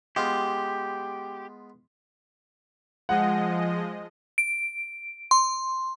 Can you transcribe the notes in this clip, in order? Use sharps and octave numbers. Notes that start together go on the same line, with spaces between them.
G#3 B3 F4 G4
F3 G#3 D#5 F#5
D7
C6